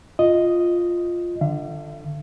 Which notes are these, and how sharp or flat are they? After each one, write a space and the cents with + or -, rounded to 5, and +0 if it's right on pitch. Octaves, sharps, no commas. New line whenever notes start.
F4 +0 D#5 +0
D3 +15 E5 +45